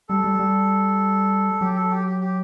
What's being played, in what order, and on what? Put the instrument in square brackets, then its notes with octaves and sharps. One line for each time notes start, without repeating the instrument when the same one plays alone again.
[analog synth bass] G3 [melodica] A4
[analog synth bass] G3
G3
[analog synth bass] F#3 [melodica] G4
[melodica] A4
G4
G4
G4